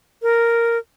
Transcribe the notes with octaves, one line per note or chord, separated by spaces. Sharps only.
A#4